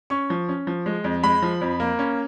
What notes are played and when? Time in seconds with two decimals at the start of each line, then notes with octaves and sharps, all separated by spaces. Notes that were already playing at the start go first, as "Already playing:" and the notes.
0.10 C#4 C#6
0.30 F3
0.49 C#4
0.67 F3
0.86 G#3
1.04 F2
1.23 G#3 B5
1.42 F3
1.61 F2
1.80 A#3
1.99 C#4